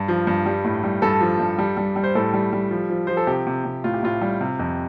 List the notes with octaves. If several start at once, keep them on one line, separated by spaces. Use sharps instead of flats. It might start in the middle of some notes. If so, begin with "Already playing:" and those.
Already playing: G2
F3
G2
G3
A2
G3
G2 A4
F3
G2
G3
G3
G3
C5
A2 A4
G3
G3
F3
F3
F3 C5
A4
C3 G4
C3
C3
A2 F4
G4
A2 F4
G3
C3
F2